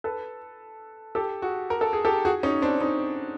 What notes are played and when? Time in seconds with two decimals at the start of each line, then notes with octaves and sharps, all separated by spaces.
0.04 A4 B4
1.15 G4 A4
1.42 F#4 G#4
1.70 A#4
1.81 A4
1.93 G#4
2.05 G4 A4
2.25 F#4 G#4
2.43 C#4 D#4
2.62 C4 D4
2.81 C#4 D#4